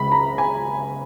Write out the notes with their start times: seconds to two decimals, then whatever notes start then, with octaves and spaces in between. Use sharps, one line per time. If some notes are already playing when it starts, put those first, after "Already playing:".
Already playing: C#2 C#3 G#3 B5
0.12 A#5
0.38 G#5